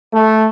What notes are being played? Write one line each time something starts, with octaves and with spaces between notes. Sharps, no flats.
A3